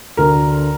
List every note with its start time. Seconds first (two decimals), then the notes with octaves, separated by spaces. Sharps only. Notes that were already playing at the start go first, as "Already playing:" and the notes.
0.17 D2 D3 A#4